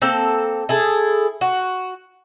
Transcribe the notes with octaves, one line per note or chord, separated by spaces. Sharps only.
A#3 C4 A4
E4 G#4 A4
F#4